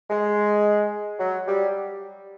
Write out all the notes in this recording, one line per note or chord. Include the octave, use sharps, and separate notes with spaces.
G#3
F#3
G3